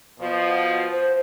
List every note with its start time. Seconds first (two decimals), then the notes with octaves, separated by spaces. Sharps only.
0.19 B2 F3
0.91 C5